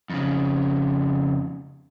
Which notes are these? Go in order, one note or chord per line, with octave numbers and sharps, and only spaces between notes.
F2 C#3